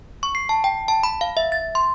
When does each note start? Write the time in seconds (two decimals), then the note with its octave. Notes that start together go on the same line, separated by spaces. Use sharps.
0.23 C#6
0.35 C7
0.49 A5
0.64 G5
0.88 A5
1.03 B5
1.21 F5
1.37 E5
1.52 A6
1.75 C6